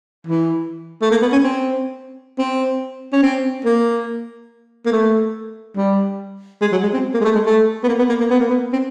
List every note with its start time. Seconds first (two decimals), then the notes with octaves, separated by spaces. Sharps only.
0.27 E3
1.01 A3
1.11 A#3
1.22 B3
1.32 C#4
1.43 C4
2.38 C4
3.13 C#4
3.23 C4
3.65 A#3
4.86 A#3
4.92 A3
5.77 G3
6.61 G#3
6.72 F#3
6.83 G#3
6.93 C4
7.14 A#3
7.21 G#3
7.24 A3
7.35 G#3
7.46 A3
7.84 B3
7.88 A#3
7.99 B3
8.09 A#3
8.20 A#3
8.30 B3
8.40 A#3
8.50 B3
8.73 C4